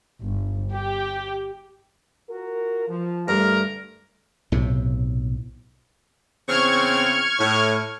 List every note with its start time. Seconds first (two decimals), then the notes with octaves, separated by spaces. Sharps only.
0.22 G1
0.72 G4
2.30 F4 F#4 A#4
2.89 F3
3.28 G2 D3 A3 A#4
4.52 B1 A2 C3
6.48 E2 C#3 C4 C#6 F6 G#6
7.39 A2